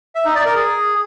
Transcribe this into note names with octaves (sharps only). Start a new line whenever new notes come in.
E5
D#4
D5
A#4
G#4